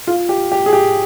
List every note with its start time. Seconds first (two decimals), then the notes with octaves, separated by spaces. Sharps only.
0.07 F4
0.29 G4
0.52 G4
0.66 G#4
0.73 G4